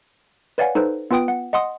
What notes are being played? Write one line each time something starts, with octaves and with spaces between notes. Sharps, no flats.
B4 C#5 D5 F5 F#5 G#5
D#4 A4 B4 C5
B3 F4 B4 G5 D#6 D7
F#5
D#5 F#5 C6 D#6